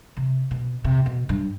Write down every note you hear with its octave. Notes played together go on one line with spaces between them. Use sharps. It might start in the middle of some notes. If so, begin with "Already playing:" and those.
C3
B2
C3
B2
G2